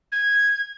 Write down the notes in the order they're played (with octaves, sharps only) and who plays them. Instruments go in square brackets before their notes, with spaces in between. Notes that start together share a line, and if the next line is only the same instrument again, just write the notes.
[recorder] G#6